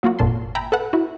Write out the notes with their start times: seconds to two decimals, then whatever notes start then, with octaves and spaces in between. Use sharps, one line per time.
0.03 F#3 A#3 F4 F#4
0.19 G#1 F2 A#2 A5 C6
0.55 E5 G5 G#5 A#5 B5
0.72 A4 B4 F#5 A5
0.93 E4 F#4